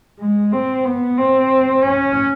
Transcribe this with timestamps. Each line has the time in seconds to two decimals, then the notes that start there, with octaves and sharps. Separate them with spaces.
0.20 G#3
0.52 C4
0.85 B3
1.18 C4
1.83 C#4